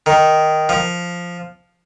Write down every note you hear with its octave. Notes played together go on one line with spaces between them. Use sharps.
D#3
F3